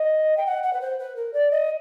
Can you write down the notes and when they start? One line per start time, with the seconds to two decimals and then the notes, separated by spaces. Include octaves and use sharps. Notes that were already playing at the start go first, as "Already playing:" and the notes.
Already playing: D#5
0.37 G5
0.46 F#5
0.63 F#5
0.73 B4
0.81 C5
0.99 B4
1.16 A#4
1.33 D5
1.51 D#5